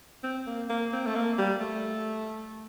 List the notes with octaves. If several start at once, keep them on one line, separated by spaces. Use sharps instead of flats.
C4
A#3
A#3
C4
A3
A#3
G3
A3